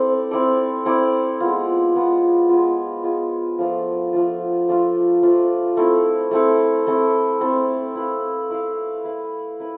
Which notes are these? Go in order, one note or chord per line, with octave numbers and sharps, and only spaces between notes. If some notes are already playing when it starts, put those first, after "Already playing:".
Already playing: C4 E4 A4 D5
C4 E4 A4 D5
C4 E4 A4 D5
G#3 B3 F4
G#3 B3 F4
G#3 B3 F4
G#3 B3 F4
F3 A3 D4 F4
F3 A3 D4 F4
F3 A3 D4 F4
F3 A3 D4 F4
A3 C4 E4 A4
A3 C4 E4 A4
A3 C4 E4 A4
A3 C4 E4 A4
E4 B4 F5
E4 B4 F5
E4 B4 F5
E4 B4